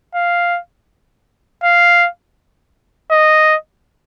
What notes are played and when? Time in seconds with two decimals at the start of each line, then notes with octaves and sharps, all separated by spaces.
0.15 F5
1.64 F5
3.11 D#5